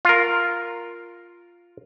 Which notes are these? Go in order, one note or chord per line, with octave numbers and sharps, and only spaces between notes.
F4 A#4